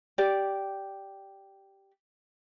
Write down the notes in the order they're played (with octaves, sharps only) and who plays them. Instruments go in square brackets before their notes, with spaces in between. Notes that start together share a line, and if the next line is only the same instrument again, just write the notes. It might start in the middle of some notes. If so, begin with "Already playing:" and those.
[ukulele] G4 D5